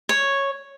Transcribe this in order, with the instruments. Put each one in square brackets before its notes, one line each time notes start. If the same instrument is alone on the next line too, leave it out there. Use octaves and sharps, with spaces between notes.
[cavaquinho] C#5